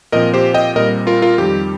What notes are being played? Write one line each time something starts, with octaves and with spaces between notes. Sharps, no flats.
A#2 F3 C4 A#4 D#5
G4 C5
D#5 G5
A#2 G3 C4 A#4 D#5
F4 A#4
F4 A#4
F2 D#3 G3 G4